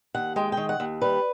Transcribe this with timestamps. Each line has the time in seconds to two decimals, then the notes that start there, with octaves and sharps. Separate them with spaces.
0.15 D#2 F#5
0.36 G#3 G5
0.52 D#3 G5
0.69 F#5
0.80 D#2
1.01 G3 B4